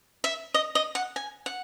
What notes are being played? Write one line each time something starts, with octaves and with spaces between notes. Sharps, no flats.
E5
D#5
D#5
F#5
G#5
F#5